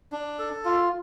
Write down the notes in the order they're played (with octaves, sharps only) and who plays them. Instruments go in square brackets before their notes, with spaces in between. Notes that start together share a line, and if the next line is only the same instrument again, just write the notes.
[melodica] D4
A4
F4